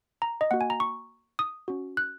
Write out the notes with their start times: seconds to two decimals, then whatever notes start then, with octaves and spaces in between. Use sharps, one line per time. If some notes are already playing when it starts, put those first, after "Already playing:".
0.22 A#5
0.41 D#5
0.51 A#3 F#4 F#5
0.61 G#5
0.70 A#5
0.80 C#6
1.39 D#6
1.68 C#4 F#4
1.97 F#6